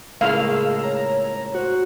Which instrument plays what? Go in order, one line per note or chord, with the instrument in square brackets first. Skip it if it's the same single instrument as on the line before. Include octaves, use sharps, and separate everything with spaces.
[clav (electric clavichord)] C#2 A2 A#3 [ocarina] G#4 [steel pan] F5 [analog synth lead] E6
[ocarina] C#5 [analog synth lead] A#5
[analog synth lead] F#4 [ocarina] C5